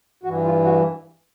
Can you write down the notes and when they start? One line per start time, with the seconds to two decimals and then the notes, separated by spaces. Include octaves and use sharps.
0.23 G2 E3 F#4
0.44 F4
0.64 F#4